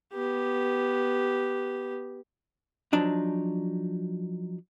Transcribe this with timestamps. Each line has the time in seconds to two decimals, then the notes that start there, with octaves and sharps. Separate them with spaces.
0.13 B3 G4
2.93 F3 F#3 D4 D#4